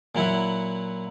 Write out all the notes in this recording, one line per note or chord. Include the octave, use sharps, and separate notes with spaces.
A#2 F#3 E4 F#5